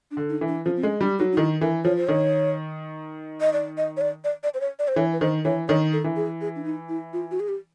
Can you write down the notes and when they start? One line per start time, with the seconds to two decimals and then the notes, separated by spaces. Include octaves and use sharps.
0.11 D4
0.17 D3
0.29 D#4
0.41 E3
0.48 D4
0.65 F3 C#4
0.76 C4
0.83 G#3 C#4
1.01 G3 D4
1.19 F#3 D#4
1.32 D#4
1.37 D#3 E4
1.61 E3 A#4
1.85 F3 C#5
1.96 C5
2.07 D#3 C#5
3.41 D#5
3.53 D5
3.78 D#5
3.97 C#5
4.01 D5
4.24 D5
4.43 D5
4.54 C5
4.61 C#5
4.79 D5
4.88 C5
4.96 E3 C#5
5.12 B4
5.20 D#3 C5
5.45 E3 C#5
5.68 D#3 C#5
5.93 A4
6.04 E3
6.16 G#4
6.41 G#4
6.56 D4
6.64 D#4
6.89 E4
7.13 F4
7.31 F#4
7.40 G#4
7.49 G4